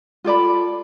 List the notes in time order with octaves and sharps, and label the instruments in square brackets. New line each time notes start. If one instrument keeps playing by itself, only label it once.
[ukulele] F4 A4 D5 B5